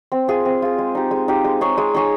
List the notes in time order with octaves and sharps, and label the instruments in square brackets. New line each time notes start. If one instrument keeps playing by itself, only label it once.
[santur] C4
F4 G#4
C4
F4 G#4
G#3
D#4 G4
G#3
D#4 G4
G#3
D#4 G#4 C#5
G#3
D#4 G#4 C#5